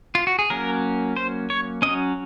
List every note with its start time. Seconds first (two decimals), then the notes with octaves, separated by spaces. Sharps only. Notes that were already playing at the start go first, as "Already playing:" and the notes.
0.15 F4
0.27 F#4
0.39 G#4
0.50 F#3 A#3 C#4 A#4
1.17 C5
1.50 C#5
1.82 F#3 C#4 D#5